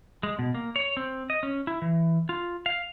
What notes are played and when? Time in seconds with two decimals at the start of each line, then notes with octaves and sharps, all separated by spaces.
0.23 G#3
0.39 B2
0.55 A#3
0.76 C#5
0.97 C4
1.30 D#5
1.43 C#4
1.67 E4
1.82 E3
2.29 F4
2.66 F5